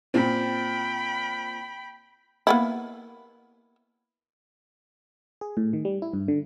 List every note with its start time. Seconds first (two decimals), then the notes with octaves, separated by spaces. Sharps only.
0.14 A#2 C4 G5 B5
2.47 A#3 B3 E4
5.41 G#4
5.57 A2
5.73 D#3
5.85 G3
6.02 E4
6.13 G2
6.28 D3